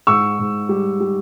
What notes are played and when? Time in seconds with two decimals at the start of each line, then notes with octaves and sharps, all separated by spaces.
0.07 G#2 C#6 E6
0.39 G#2
0.69 G3
1.00 G3